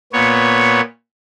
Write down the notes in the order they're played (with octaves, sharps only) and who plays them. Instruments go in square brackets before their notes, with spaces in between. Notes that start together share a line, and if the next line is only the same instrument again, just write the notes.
[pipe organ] A#2 B3 C#5